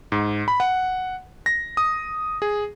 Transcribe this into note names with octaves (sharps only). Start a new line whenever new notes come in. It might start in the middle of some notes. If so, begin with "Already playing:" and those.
G#2
B5
F#5
A#6
D#6
G#4